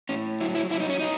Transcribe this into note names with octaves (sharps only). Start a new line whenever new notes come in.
A2 C#4
F#3 E4
E4
F#3 E4
D#4
C#4
F#3 D#4